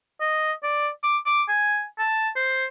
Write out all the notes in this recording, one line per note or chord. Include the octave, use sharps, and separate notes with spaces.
D#5
D5
D6
D6
G#5
A5
C5